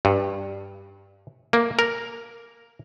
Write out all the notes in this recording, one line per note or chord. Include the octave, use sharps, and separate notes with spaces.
G2
A#3
A#4